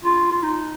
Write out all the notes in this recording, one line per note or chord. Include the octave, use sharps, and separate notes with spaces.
F4
F4
D#4